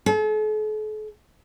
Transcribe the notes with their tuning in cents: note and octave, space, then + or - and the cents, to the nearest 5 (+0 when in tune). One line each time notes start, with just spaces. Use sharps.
A4 -45